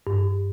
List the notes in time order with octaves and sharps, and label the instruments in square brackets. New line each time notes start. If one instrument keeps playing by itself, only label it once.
[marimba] G2